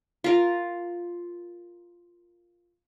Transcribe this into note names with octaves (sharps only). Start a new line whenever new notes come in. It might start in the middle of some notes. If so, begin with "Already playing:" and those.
F4 A#4